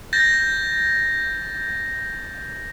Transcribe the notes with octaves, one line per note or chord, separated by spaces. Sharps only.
G6 A6 A#6